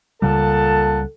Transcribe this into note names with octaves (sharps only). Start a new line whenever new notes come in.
C#2 A#2 C#3 G3 A4 F#5 A5